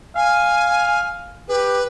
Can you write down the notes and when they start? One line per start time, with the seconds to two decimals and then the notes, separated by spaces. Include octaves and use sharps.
0.16 F5 G#5
1.49 G4 B4